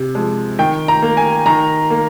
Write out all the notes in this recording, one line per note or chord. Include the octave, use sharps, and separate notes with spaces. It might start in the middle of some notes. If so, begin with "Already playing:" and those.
Already playing: C3
F3 G#3
D#3 G5
A#5
A#3
G#5
D#3 A#5
A#3